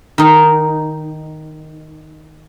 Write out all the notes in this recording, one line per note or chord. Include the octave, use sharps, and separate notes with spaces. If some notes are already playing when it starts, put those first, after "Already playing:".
D#3 D#4